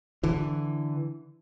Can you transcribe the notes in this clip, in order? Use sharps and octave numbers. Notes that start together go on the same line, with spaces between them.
D3 E3